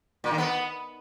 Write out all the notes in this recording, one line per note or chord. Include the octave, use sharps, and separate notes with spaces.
A#2
D#3
B3